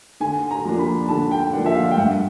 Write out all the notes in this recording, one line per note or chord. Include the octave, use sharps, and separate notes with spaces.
D3 G#5
A#5
F3 A#3 D4
B5
D3 A5
G5
F3 A#3 D4 F#5
E5
F5
G5
G2 F#5